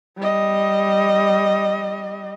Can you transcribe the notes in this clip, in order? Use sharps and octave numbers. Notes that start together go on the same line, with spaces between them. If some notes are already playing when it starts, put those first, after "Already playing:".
G3 D#5